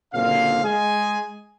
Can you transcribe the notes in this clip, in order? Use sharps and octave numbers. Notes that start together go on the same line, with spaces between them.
F#1 A#2 D3 C4 F5
G#3 G#4 G#5